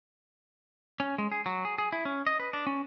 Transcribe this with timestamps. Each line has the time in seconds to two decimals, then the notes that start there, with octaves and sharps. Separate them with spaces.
1.00 C#4
1.18 G#3
1.32 G#4
1.46 F#3
1.65 G#4
1.78 G#4
1.92 E4
2.05 C#4
2.27 D#5
2.40 B4
2.53 D4
2.67 C#4